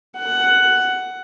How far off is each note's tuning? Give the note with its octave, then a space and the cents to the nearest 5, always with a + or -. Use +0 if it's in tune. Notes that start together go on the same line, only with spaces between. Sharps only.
F#5 +10